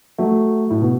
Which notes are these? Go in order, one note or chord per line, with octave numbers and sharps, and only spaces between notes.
F#3 A3
A2
B2